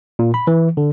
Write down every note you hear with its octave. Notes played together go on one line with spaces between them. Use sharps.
A#2
B5
E3
D3